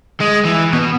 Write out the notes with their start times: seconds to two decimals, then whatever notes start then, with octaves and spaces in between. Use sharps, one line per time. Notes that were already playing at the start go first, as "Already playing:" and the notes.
0.20 G#3
0.45 E3
0.73 B2